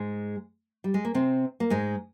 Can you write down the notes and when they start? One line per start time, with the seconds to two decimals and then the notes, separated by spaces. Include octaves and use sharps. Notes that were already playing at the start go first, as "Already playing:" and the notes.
Already playing: G#2 G#3
0.84 G3
0.94 G#3
1.05 A#3
1.14 C3 C4
1.60 A#3
1.70 G#2 G#3